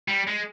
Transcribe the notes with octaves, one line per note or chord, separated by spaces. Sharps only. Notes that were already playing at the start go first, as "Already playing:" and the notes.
G3
G#3